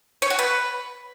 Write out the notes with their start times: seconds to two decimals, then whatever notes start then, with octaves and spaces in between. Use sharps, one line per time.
0.22 C#5
0.30 F#4
0.39 B4